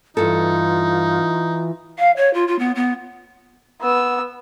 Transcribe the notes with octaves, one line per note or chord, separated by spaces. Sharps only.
G2 E3 D#4 F4 A4
F5
C#5
F4
F4
B3
B3
B3 E6